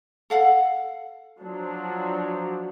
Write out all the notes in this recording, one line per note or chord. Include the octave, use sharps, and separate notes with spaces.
A4 F5 F#5
F3 F#3 D4